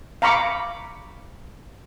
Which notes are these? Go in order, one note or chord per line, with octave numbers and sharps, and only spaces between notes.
F5 A#5 B5 C#6 D6